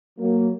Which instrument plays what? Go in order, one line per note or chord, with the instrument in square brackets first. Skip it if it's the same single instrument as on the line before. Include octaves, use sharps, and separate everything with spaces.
[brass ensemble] F#3 A#3